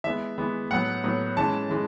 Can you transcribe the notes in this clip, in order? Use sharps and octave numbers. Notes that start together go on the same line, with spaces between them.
E3 G#3 B3 E5
E3 G#3 B3
A2 F#3 B3 F#5
A2 F#3 B3
E3 G#3 C#4 A5
E3 G#3